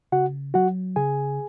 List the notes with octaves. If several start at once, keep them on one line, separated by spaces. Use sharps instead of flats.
C#3 F#4 F#5
F#3 F#4 F#5
C#3 G#4 G#5